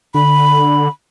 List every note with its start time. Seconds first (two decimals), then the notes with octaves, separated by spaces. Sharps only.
0.14 D3 B5